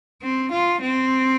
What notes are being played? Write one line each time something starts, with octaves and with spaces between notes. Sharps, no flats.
C4
F4
C4